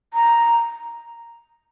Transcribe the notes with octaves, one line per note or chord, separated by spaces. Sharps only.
A#5